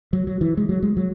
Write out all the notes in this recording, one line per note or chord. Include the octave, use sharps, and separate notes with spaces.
F#3
F#3
E3
G#3
F#3
G#3
F#3